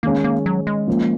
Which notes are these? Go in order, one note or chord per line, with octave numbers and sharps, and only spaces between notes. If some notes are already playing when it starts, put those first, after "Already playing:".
D#3 G#3 A#3 C#4
A#3
F#3
G#3
F3 A#3 C#4